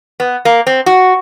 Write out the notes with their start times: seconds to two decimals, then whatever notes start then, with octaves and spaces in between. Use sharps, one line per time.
0.20 B3
0.45 A#3
0.67 C4
0.86 F#4